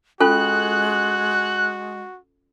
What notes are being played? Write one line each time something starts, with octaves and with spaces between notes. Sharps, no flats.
G#3 C#4 F4 F#4 A4 F#6